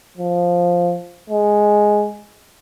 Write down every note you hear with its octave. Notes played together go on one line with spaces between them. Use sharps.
F3
G#3